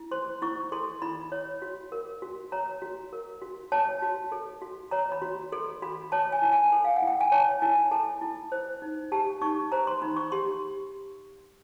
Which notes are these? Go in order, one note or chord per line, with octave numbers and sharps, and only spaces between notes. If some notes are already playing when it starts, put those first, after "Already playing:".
Already playing: E4
C5 C6
E4 C#6
A4 C6
E4 B5
C#5
F#4
A#4
F#4
C#5 A#5
F#4
A#4
F#4
C#5 A5
F#4
A4
F#4
C#5 A#5
B5
F#4
A4 C6
F#4 B5
C#5 A5
G#5
E4
G#5
A4
F5
F#5
E4
G5
G#5
C#5 A5
E4 G#5
A4 A5
E4
C5
D#4
G4 A5
D#4 C#6
C5 A#5
C6
D#4 B5
C#6
G4 C6